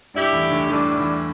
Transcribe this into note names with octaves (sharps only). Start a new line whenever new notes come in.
G2 G3 E4 G4
E2 A2
A2 D3
A2 D3 E3 G3 D4
E2 A2